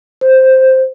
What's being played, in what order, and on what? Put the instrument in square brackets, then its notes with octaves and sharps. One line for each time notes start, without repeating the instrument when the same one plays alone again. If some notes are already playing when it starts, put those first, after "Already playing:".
[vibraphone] C5